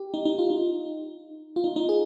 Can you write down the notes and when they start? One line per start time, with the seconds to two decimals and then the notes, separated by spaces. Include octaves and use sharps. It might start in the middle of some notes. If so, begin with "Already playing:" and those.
Already playing: G4
0.14 D#4
0.25 D#4
0.38 F4
0.50 D#4
1.56 F4
1.64 D#4
1.76 D#4
1.89 G#4